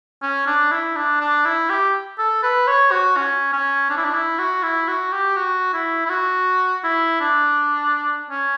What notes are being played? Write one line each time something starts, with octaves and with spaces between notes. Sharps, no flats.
C#4
D4
E4
D4
D4
E4
G4
A4
B4
C#5
F#4
C#4
C#4
D4
E4
D4
E4
F#4
E4
F#4
G4
F#4
E4
E4
F#4
E4
D4
C#4